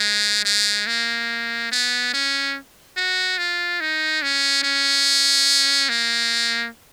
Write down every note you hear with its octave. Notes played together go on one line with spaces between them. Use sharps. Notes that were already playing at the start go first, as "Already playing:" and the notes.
Already playing: G#3
G#3
A#3
B3
C#4
F#4
F4
D#4
C#4
C#4
A#3